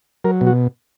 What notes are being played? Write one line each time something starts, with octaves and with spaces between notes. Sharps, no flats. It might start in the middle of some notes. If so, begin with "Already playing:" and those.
F#3 A#4
B2
F#4